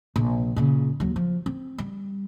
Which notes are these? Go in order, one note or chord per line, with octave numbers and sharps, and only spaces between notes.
A#1 C3
A#2 C#3
D#2 F#3
F3
C4
G3